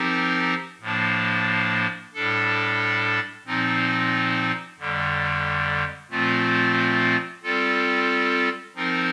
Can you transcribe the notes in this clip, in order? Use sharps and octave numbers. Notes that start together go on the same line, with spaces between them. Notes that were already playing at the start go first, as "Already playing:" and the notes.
Already playing: F3 C4 D#4 G4 A#4
A2 F3 A#3 D4
A2 G3 D4 A4
A#2 F3 C4 D#4
F2 D3 G3
A#2 F3 A3 C4 F4
G3 C4 F4 A4
F3 C4 D#4 A#4